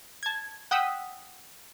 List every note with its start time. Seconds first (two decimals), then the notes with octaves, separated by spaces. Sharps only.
0.23 A5 G#6
0.71 F#5 G5 D#6 E6 B6